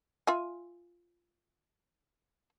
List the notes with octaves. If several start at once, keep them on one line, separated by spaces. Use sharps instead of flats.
F4 E5 G#5